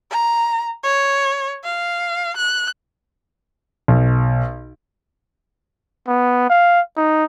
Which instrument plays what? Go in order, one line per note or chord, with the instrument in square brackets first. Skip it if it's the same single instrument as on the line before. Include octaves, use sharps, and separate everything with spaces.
[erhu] A#5
C#5
F5
F#6
[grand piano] B1
[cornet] B3
F5
D#4